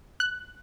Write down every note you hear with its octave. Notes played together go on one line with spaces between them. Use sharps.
F#6